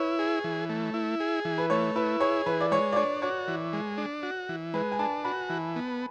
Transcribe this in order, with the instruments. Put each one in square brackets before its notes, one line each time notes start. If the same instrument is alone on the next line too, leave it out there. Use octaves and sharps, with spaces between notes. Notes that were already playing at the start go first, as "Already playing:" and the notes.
Already playing: [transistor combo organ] E4 [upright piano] B4 C#5
[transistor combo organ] G#4
E3
A3
E4
G#4
E3
[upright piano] B4
[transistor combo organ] A3 [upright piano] C#5
[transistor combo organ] E4 [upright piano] B4
[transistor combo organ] G#4 [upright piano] C#5
[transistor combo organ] E3 [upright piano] B4
[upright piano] D5
[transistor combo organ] G#3 [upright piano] C#5
[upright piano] D5
[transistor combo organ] D4 [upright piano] C#5
[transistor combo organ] F#4 [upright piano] C#5
[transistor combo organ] E3
G#3
D4
F#4
E3
[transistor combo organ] G#3 [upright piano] B4
[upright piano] G#5
[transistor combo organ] D4 [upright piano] A5
[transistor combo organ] F#4 [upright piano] B5
[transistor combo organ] E3
B3